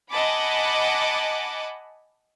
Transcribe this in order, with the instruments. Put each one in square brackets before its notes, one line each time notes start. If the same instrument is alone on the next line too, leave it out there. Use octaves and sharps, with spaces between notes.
[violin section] D#5 F#5 G#5 A5 B5 D6